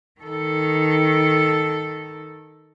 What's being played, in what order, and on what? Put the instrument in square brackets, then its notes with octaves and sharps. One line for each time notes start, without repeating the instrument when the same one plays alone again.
[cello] D#3 A4